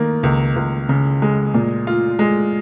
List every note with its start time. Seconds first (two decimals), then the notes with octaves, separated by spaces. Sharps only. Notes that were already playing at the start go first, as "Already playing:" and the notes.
Already playing: D#3 A#3
0.23 C#2
0.56 C#2
0.89 C#3
1.22 G#3
1.54 A#2
1.87 F4
2.19 G#3